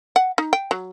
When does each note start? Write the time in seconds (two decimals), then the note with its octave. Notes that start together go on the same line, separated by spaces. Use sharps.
0.16 F#5
0.38 D#4
0.53 G5
0.71 F#3